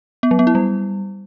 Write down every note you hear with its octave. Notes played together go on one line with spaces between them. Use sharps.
B3
F#3
B3
E4
G3